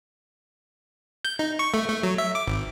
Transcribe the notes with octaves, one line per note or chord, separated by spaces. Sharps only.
G6
D#4
C#6
A3
A3
F#3
E5
D6
G#1